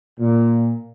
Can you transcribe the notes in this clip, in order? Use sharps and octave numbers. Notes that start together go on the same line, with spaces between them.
A#2